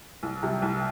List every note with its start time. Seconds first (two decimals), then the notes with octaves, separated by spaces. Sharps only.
0.23 C2
0.43 C3 G3
0.62 C2